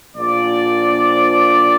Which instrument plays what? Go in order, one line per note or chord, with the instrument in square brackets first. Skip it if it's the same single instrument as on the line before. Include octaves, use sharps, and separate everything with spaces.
[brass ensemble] A#1 A#2 F3 D5